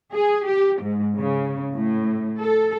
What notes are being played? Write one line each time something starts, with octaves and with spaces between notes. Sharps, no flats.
G#4
G4
G#2
C#3
A2
A4